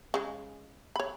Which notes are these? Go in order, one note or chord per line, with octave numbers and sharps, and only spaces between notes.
C#3 G#3
C#5 B5